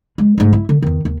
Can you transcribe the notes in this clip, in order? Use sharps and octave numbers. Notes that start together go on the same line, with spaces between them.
G#3
G#2 A3
E4
D3
E2 D#3
D#2